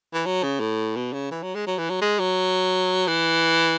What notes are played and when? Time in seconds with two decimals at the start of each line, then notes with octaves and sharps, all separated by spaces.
0.14 E3
0.26 F#3
0.43 C#3
0.60 A2
0.96 B2
1.13 C#3
1.31 E3
1.43 F#3
1.55 G#3
1.67 F#3
1.79 E3
1.90 F#3
2.01 G#3
2.20 F#3
3.07 E3